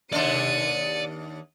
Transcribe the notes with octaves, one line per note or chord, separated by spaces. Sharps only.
D#2 D4 D5 C6 C#7 D#7